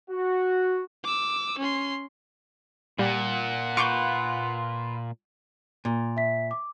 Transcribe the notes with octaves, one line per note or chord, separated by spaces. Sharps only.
F#4
D6 E6
C#4 C6
A#2 G3 F#5
F4 B4 C#6 D6 G6
A#2
E5 B6
D6